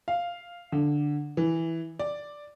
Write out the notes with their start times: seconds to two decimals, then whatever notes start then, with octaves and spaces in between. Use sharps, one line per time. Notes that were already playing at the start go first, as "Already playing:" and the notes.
0.08 F5
0.72 D3
1.37 E3
1.99 D5